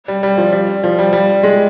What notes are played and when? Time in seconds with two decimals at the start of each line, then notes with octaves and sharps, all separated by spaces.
0.08 G3
0.23 G3
0.37 F3
0.53 G3
0.84 F3
0.99 G3
1.13 G3
1.43 G#3